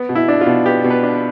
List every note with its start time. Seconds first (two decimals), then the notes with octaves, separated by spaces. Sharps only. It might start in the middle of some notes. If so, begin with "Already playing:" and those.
Already playing: B3
0.09 B2
0.15 E4
0.28 D4
0.41 F4
0.46 B2
0.66 B3 G4
0.84 B2
0.91 B4
1.03 D4